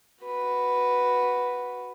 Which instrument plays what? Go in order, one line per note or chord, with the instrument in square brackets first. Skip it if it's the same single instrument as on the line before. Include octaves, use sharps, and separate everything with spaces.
[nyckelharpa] F#4 B4